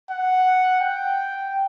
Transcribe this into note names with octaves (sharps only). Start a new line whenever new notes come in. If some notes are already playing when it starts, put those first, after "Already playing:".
F#5
G5